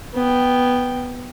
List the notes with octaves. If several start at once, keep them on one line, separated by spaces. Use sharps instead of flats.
B3 G5